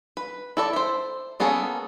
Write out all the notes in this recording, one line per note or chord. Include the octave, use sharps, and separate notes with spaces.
B4
E4 A4 D5
C5 E5
A#3 B3 C#4 G#4 A4